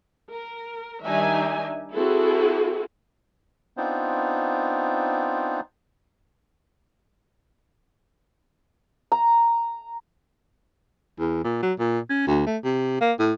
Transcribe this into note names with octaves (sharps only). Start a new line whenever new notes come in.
A#4
D#3 G3 D4 D#4 E5 G#5
C4 E4 F#4 G#4 A4
B3 C4 D4 D#4 F4 C5
A#5
E2
A#2
F#3
A#2
C#4
D2
A3
C3
A#3
A2